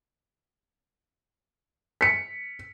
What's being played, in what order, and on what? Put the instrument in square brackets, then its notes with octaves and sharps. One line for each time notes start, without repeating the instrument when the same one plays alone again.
[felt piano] B6 C#7